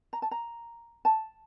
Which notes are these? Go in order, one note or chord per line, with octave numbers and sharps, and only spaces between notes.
A#5
A5
A#5
A5